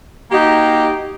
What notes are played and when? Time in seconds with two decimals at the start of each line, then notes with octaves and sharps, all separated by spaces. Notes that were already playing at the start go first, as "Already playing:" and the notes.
0.31 A#3 D#4 F#4 G4